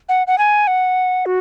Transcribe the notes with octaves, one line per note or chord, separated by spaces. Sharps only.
F#5
F#5
G#5
F#5
F#4